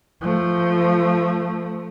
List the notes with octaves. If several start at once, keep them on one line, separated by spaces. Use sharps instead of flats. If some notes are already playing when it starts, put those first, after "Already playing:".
F3 A3